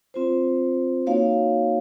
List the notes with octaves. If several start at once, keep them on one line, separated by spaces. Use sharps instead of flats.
C4 F4 C5
A#3 D#4 F#4 C#5 F5